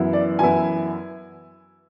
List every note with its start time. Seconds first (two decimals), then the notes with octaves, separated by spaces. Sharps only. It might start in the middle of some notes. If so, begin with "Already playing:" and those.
Already playing: F#2 E3 B3 E4
0.13 D5
0.39 F#2 E3 B3 E4 G#5